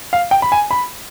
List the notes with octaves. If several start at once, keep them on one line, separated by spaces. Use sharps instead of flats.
F5
G5
B5
G#5
B5